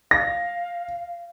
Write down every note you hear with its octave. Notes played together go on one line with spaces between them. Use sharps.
F5 A#6